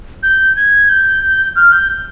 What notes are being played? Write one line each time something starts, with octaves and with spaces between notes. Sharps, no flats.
G6
G#6
G6
F6
G6